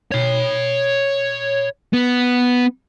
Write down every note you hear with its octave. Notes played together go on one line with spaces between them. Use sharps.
C#5 B5
B3